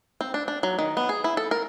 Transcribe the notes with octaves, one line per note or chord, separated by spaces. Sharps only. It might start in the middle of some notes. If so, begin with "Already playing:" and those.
C4
D4
D4
F#3
D#3
B3
G#4
E4
A4
A#4